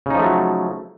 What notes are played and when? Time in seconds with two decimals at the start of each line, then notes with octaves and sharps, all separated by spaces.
0.06 C#3
0.10 D#4
0.15 F3
0.19 A3
0.23 F#3